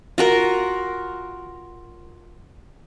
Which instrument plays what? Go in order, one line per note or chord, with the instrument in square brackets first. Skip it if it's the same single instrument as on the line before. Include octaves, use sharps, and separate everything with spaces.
[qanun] F4 F#4 A#4